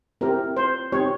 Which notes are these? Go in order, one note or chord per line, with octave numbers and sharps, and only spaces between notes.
C4 E4 G4 A#4
C5
C4 D#4 G4 C#5